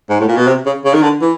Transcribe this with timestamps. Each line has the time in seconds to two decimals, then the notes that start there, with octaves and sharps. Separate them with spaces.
0.10 G#2
0.20 A2
0.28 A#2
0.37 B2
0.47 C3
0.66 C#3
0.85 C#3
0.94 D#3
1.02 D3
1.22 E3